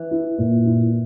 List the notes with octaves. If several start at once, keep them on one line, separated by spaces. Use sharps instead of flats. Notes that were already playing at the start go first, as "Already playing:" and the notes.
Already playing: E3
E4
A#2
E4